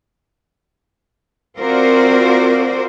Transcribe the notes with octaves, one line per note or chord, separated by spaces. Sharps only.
C4 F4 F#4 A#4 C5 D5